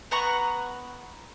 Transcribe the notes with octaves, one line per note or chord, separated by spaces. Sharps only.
B3 F#5 A#5 C#6